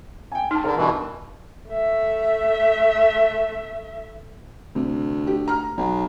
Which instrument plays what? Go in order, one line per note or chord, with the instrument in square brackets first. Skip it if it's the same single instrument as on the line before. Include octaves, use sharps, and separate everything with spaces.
[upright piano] G5 G#5
[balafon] D#4 [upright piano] A5 F6
[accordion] D3 [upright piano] A#4
[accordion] G2 B2 E3
[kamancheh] A3 E5
[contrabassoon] D2 [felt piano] C3
[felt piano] G4
A#5 F6
[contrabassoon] B1